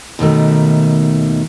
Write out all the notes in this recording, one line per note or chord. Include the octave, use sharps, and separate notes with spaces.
D#2 B2 D#3 A3